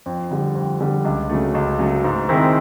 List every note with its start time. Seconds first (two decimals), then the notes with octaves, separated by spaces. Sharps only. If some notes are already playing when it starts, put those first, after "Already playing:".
0.06 F2
0.31 D3 G3
0.55 F2
0.81 D3 G3
1.05 C#2
1.30 C#3 F#3 A3
1.55 C#2
1.79 C#3 F#3 A3
2.04 G#2
2.29 D#3 G#3 C4 E4